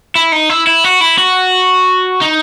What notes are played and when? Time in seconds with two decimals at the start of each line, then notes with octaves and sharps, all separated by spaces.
0.15 E4
0.32 D#4
0.49 E4
0.67 E4
0.84 F#4
1.01 E4
1.18 F#4
2.22 D#4